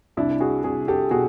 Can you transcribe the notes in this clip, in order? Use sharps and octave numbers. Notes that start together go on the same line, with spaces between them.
C2 D4 E4
F#4 G#4
C2 F#4 G#4
G4 A4
B2 F#4 G#4